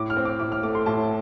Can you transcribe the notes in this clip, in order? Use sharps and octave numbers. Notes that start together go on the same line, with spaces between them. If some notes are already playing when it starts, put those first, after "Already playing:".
Already playing: A2 D6
F6
C4
D6
A2 D6
F6
A3 D6
C6
A2 A5